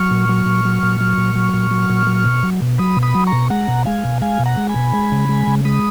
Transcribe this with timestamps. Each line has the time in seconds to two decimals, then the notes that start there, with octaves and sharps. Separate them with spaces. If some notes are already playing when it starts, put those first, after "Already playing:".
Already playing: F#3 C#6 F6
0.11 A#2
0.29 F#3
0.46 A#2
0.65 F#3
0.83 A#2
1.01 F#3
1.17 A#2
1.35 F#3
1.54 A#2
1.71 F#3
1.90 A#2
2.07 F#3
2.25 B2
2.43 F#3
2.62 B2
2.78 F#3 B5 D#6
2.97 B2
3.02 B5 D#6
3.15 F#3
3.27 A#5 C#6
3.33 B2
3.50 G#3 F#5 A#5
3.68 B2
3.86 G#3 F5 G#5
4.05 B2
4.21 G#3 F5 G#5
4.39 B2
4.46 F#5 A#5
4.57 G#3
4.69 G#5 B5
4.76 B2
4.94 G#3
5.12 C#3
5.29 G#3
5.47 C#3
5.65 G#3 B5 D#6